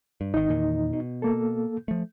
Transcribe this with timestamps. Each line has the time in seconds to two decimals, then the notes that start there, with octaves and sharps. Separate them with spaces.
0.21 G2
0.34 G#1 D#3 D#4 D#5
0.48 E2 A#2 D#3
0.93 B2
1.22 A#3 A4
1.88 F3 A3